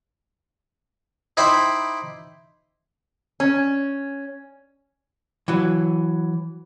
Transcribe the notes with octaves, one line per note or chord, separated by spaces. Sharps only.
D#4 E4 C5 G5 B5 D6
C#4
E3 F#3